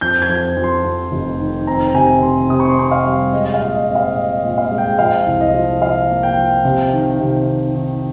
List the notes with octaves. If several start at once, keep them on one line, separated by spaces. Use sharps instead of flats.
F2 G6
G#6
F2
F2
C6
F2
F1
D#3
C4 A#5
C3 G#5
C3 C6
C3 D#6
C#6
C6
C4 C#6
F5
G3
G#3 D#5
F5
A#2
D#5
C4
F5
A#2 D#5
D#5
A#2
F5
G#3
G5
F3 F5
C2
D#5
F3
F3 F5
A#3
G5
F3
C3
D#3
C3
D#3
D#3